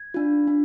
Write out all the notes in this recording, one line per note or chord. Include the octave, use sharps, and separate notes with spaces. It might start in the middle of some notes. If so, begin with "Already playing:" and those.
Already playing: G#6
D4 F4
D4